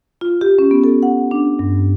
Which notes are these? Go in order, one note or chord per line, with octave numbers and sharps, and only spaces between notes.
F4
G4
C#4
B3
A4
F#5
D4
G2